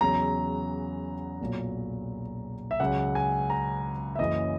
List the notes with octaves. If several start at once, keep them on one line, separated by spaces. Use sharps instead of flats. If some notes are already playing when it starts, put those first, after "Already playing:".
E2 C#3 F#3 A#5
B1 A#2 F#3
E5
C#2 C#3 F#3 F#5
G#5
A#5
E5
F#1 F#2 C#3 E3 D#5